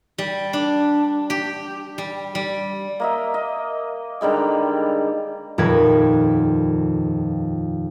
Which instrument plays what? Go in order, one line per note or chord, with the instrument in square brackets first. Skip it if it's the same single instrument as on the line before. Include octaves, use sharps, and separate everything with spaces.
[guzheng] G3
D4
G4
G3
G3
[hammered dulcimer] A#3 D#5 E5
D#5
D3 D#3 G3 G#3
[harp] D#1 F2 A#4 B4 G#6